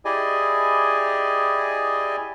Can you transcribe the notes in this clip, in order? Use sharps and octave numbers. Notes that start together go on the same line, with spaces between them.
E4 G4 G#4 D5 D#5 G#5